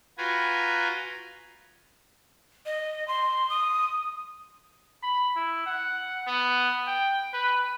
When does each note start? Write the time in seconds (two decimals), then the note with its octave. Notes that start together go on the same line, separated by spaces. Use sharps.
0.18 F4 F#4 B4 G5 G#5 A#5
2.66 D#5
3.08 C6
3.50 D#6
5.03 B5
5.36 E4
5.66 F#5
6.27 B3
6.87 G5
7.33 B4